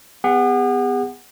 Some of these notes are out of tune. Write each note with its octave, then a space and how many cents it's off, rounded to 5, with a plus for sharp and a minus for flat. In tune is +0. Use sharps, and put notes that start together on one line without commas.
B3 +20 G#4 -45 F#5 +0